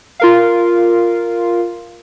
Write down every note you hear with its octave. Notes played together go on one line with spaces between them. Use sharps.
F4 A#4 F5